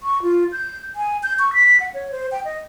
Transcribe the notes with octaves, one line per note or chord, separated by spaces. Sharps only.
C#6
F4
G6
G#5
G6
C#6
B6
F#5
C#5
C5
G5
D#5